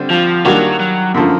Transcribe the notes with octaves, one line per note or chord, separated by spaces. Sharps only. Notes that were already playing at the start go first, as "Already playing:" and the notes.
Already playing: D3 G3 C4
F3
D#3 F#3 G3 A#3 D4 F#4
F#3
F#2 D3 F3